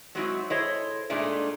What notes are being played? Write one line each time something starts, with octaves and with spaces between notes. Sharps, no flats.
F#3 G#3 C4 D#4 E4 F#4
E4 G#4 A4 C5 C#5 D#5
A#2 G#3 A3 D4 D#4